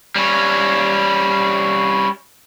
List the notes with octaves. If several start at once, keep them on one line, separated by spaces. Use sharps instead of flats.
G3 C#4